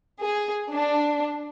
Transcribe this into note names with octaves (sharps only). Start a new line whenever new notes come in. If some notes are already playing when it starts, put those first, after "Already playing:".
G#4
D4